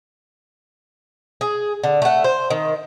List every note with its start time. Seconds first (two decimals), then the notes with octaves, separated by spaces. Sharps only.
1.41 G#4
1.84 D3
2.02 A3 F#5
2.24 C5
2.50 D#3